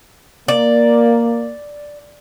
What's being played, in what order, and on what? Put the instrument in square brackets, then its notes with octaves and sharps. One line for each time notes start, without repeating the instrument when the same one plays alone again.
[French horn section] A#3 [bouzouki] D5